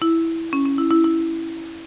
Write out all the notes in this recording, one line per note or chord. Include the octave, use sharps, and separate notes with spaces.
E4
C#4
C#4
E4
E4
E4